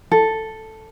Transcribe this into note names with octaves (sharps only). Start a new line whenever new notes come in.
A4